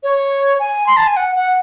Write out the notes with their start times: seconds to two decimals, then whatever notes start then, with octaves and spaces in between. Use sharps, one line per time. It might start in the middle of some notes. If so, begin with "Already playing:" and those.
0.03 C#5
0.60 G#5
0.87 C6
0.97 A5
1.07 G#5
1.17 F#5
1.36 F#5